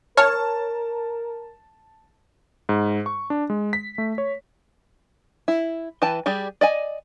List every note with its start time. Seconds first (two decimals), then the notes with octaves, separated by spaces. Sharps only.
0.17 A#4 C#5 A5 F6
2.69 G#2
3.06 C#6
3.30 D4
3.50 G#3
3.73 B6
3.98 A3
4.18 C#5
5.48 E4
6.02 E3 B4 G5 A5
6.26 G3 G4 G#4 D5
6.61 D5 D#5 G#5